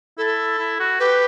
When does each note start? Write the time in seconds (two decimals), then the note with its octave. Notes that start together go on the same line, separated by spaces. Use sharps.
0.18 E4 A4
0.58 E4
0.80 F#4
1.00 G4 B4